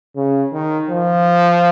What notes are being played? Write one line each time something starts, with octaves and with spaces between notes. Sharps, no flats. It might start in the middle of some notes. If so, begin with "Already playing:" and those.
C#3
D#3
F3